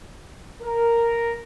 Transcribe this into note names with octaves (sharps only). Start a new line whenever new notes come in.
A#4